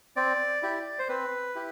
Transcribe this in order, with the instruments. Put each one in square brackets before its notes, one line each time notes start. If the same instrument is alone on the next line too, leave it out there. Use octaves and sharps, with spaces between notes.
[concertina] C4 D5
E4 G4
C5
C4 B4
E4 G4